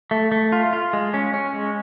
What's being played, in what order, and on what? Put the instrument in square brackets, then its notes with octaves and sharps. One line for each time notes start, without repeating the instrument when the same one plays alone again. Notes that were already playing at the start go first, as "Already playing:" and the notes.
[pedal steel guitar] A3
A3
F4
F4
G#3
C#4
C#4
G#3